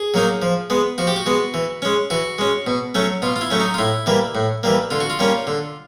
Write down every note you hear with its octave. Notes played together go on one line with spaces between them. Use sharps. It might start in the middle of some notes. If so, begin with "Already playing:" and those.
Already playing: G#4
F#3 A#3 D#4
F3
G#3 B3
F3 F#4
G4
F#4
G#3 B3
E3
G#3 C#4
E3 F#4
G#3 C#4
B2
F#3 A3 C#4
B2 F4
F4
E4
F#3 A3 C#4
D#4
F4
A2 E4
E3 G3 A#3
A2
E3 G3 A#3
D3 F4
F#4
F4
G3 A#3 C#4
D3